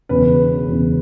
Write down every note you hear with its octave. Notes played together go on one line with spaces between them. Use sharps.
E1 E2 C#3 B4
E1 E2 C#3